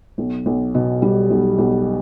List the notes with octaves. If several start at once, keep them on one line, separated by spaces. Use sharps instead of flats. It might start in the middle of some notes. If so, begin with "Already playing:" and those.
B1
B1
B2
G3
B1
B1